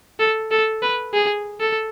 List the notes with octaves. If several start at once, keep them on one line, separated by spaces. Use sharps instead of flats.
A4
A4
B4
G#4
A4